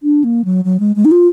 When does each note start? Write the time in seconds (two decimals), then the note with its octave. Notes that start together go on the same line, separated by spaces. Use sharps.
0.03 D4
0.24 A#3
0.45 F#3
0.65 F#3
0.80 G#3
0.96 G#3
1.05 D#4
1.11 F4